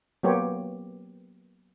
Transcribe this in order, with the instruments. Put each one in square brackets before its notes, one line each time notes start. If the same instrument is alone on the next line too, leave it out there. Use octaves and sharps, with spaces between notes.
[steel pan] F#3 A#3 B3 G4 C5 C#5